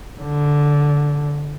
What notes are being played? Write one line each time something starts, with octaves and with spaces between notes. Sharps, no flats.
D3